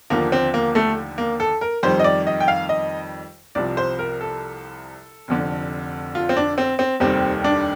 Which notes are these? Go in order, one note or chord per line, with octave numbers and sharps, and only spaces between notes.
D#2 D3 F3 A#3
C4
A#3
A3
A#3
A4
A#4
F2 D#3 G3 C5
D#5
D5
D#5
G5
F5
D#5
C2 C3 F3 D5
C5
A#4
A4
F1 F2 D3
F4
C4
D4
C4
C4
F1 D#2 D#3 G3 C4
D4